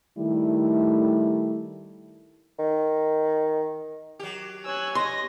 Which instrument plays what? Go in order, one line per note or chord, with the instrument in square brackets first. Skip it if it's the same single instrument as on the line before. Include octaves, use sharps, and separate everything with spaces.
[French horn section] D#3 G3 A3 E4
[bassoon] D#3
[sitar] F#3 G4
[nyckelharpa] C#5 G#5 [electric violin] E6 F#6
[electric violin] D#5 A#6 [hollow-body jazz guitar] C6